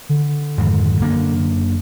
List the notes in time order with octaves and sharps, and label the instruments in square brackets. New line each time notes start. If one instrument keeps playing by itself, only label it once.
[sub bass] D3
[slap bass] F2 G#2 D#3
F#2 A#3 D4